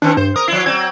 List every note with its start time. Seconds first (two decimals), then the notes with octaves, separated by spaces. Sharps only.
0.02 D#3 C4 D4
0.17 G2 C5
0.36 A#4 D#6
0.48 F3 E4 C7
0.66 F#3 C4 G#6